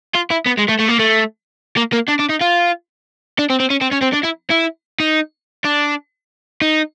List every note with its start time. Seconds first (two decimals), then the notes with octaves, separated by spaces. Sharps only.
0.15 F4
0.31 E4
0.47 B3
0.59 G#3
0.69 A3
0.80 A3
0.89 A#3
1.00 A3
1.77 A#3
1.93 A#3
2.09 D4
2.20 D4
2.30 D#4
2.41 F4
3.39 D4
3.50 C4
3.60 C4
3.70 C#4
3.82 C4
3.93 C#4
4.02 C4
4.14 D4
4.24 E4
4.51 E4
5.00 D#4
5.65 D4
6.62 D#4